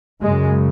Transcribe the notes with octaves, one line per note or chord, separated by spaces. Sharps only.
F#2 C#3 G#3